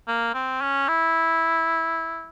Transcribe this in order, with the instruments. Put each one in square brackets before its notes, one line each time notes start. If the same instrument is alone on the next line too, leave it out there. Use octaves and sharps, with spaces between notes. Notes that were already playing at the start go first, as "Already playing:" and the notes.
[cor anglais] A#3
C4
C#4
E4